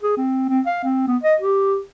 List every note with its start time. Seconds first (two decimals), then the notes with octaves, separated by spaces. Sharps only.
0.03 G#4
0.17 C4
0.49 C4
0.66 F5
0.84 C4
1.08 B3
1.23 D#5
1.41 G4